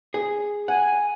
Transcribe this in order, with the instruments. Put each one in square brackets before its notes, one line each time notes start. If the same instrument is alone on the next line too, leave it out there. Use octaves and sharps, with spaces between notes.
[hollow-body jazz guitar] G#4
[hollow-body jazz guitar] F#5 [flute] G#5